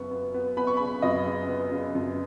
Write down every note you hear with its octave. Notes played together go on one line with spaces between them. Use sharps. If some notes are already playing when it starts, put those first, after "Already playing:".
Already playing: F#2 C#3 B3 C#6
B3
B3
B3 B5
C#6
B5
C#3
F#2 D#5
C#3
B3
C#3
F#2